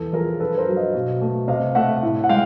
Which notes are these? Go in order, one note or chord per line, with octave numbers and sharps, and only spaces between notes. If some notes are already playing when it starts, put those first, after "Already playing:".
Already playing: E2 A4
F3 G#4 A#4
G2 A4 B4
A#4 C5
F#3
D#5 F5
B2
A3
C3 D#5 F5
A3 E5 F#5
A2
F#5
G#3 F5 G5